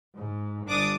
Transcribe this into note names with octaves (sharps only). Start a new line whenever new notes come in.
G#2
G1 D4 D6 D#6